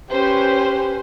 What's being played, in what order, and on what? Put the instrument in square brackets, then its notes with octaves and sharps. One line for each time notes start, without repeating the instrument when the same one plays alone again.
[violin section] C#4 B4 C5 [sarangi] G4